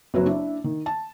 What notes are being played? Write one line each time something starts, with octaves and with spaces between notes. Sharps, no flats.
F#1 F#3 C4 F#4 B4 C#5
D4 E4 E5
D#3
A5